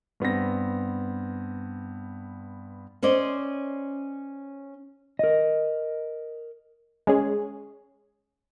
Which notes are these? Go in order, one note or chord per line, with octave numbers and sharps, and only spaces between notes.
G2 B3 C4 A#6
C#4 C5 D5 D#5
A#4 D#5
G#3 C#4 G#4